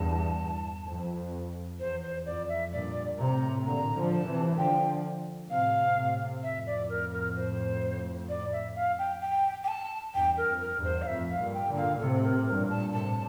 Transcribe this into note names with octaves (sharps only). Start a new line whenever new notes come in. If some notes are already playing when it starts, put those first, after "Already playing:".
Already playing: E2 G2 A5
F2
E2 C5
C5
F2 D5
E5
G2 A#2 D5
A2 C3 A#5
A#2 D3 A#5
D3 F3
A5
C3 E3
D3 F3 G5
A2 C3 F5
A2 C3
F2 A2 E5
D5
A#4
A#4
C5
D5
E5
F5
G5
G5
G5
A5
E2 G2 G5
A#4
F2
A#4
E2 G2
C5
F5
F2 A2 E5
F5
G2 A#2
G5
A#2 D3
F5
A2 C3 A4
A#4
G2 A#2 A#4
A5
A2 C3 A5